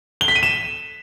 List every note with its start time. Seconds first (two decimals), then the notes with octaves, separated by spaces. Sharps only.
0.21 G7
0.28 B6
0.35 D#7
0.43 E7